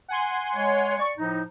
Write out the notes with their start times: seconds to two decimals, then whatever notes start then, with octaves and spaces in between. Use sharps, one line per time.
0.08 F#5 G#5 C6
0.55 G#3 C#5
0.99 D5 C#6
1.18 A2 F3 D#4